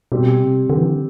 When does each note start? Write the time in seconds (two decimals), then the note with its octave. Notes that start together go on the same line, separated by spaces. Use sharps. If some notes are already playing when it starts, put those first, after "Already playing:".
0.12 B2 G3 C4 G4
0.40 C3
0.70 D3
0.77 E3
0.84 D3